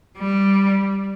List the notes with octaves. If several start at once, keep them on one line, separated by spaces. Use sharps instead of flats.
G3